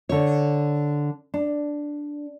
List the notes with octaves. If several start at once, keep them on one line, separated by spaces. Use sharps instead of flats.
D3 C#5
D4